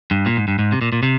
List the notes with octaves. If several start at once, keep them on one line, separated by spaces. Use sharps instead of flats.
G2
A#2
G#2
G2
G#2
C3
A#2
A#2
C3